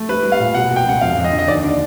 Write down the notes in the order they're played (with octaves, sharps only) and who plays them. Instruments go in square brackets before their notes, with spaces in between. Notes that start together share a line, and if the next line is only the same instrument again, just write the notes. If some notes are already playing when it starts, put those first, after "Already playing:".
Already playing: [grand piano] A3
G3 B4
G3
F5
A#2
B2 F#5
B2
G5
C#2 F#5
F2 F5
F2
D#5
D3
D#5
D#2 D5
D3